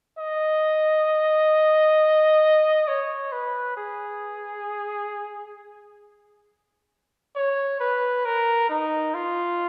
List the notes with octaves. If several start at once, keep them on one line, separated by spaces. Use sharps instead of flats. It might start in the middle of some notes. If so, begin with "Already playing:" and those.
D#5
C#5
B4
G#4
C#5
B4
A#4
D#4
F4